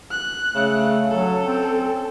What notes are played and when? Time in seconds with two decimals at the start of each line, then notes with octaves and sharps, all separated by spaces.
0.11 F#6
0.55 C#3 A3
1.11 F#3 C#4 A4
1.44 C4